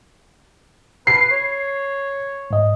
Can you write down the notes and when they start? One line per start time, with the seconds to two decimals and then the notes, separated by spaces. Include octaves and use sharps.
1.07 B4 C7
1.31 C#5
2.51 G#2 D#5